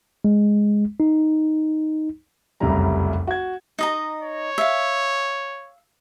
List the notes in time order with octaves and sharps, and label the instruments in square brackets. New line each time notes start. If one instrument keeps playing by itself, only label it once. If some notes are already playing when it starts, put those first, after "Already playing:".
[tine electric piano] G#3
D#4
[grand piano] F1 C2 F#2 C#3 G3 A#5
F#4 G#6
[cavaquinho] D#4 D#5 A#5
[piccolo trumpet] C#5
[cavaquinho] E5 F5